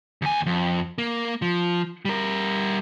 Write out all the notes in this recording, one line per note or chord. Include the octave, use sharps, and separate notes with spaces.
D#2 G#5
F2
A#3
F3
G3 A#4